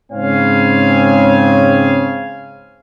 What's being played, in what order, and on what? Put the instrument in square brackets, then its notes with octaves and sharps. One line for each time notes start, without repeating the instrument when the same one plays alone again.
[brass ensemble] G#2 C#3 C4 C#5 F5 G#5